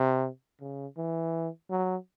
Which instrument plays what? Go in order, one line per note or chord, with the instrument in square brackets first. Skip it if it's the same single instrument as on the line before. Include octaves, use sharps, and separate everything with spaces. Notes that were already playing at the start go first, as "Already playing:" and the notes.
Already playing: [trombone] C3
C#3
E3
F#3